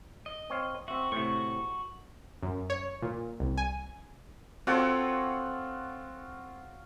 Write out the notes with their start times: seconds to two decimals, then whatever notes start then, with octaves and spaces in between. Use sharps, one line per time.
0.26 D#5
0.50 C4 C#5 F5
0.88 C4 F#4 E5
1.12 A2 C3 F#4 C#6
2.42 F#2
2.70 C#5
3.02 A#2
3.40 C2
3.58 G#5
4.67 C4 F4 F#4 A4 C#5